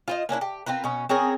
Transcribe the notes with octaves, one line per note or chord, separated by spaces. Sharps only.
F4 C5 D#5
A#3 C#4 D4 E4
G4
C4 F4 A#4 B4
B2 C#4
C4 C#4 G#4 A#4